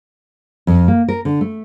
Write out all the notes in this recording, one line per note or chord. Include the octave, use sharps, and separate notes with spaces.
F2
A#3
A#4
D3
A3